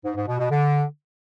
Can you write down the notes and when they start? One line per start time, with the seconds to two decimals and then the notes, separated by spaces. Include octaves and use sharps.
0.04 G#2
0.16 G#2
0.27 B2
0.39 B2
0.50 D3